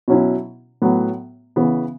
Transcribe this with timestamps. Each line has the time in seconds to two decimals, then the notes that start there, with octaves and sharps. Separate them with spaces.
0.08 B2 F#3 C#4 E4
0.82 A2 F#3 B3
1.56 C#3 E3 B3